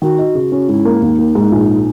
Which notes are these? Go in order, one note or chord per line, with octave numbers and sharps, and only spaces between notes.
D#3 F#4
D#4
C#3
C#4
G#2 E4
A#3
D#2 D#4
A#3
G#2
A#1